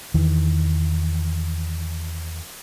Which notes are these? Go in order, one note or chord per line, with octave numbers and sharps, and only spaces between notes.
E2 D#3 E3